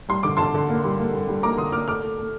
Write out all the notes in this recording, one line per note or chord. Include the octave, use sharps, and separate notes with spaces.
G3 C6
D3 D6
D3 A5 C6
D3
A#3
G3
A#3
G3
G3
A#3 A#5 D6
D3 C6 D#6
A#3 D6 F6
A3 D6 F6
A3
A3